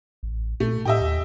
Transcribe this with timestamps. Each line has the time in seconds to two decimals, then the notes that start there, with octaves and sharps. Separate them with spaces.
0.23 A1
0.60 A#2 A3
0.85 A2 G4 D#5 E5
1.01 D#2